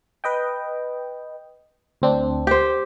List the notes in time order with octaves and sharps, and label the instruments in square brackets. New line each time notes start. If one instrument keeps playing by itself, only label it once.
[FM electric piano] B4 D#5 G5
D2 C4 D4
[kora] G4 C5